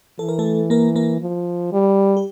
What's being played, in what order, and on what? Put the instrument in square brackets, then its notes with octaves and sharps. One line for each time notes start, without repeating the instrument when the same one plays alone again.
[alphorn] E3 [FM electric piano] A4
[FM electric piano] A#4
A3 A4
A#3 A#4
A#3 A#4
[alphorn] F3
G3
[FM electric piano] G4